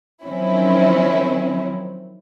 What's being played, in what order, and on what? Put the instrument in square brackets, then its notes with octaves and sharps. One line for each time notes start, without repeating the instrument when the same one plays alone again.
[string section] D#3 F3 F#3 C4 C#4 E4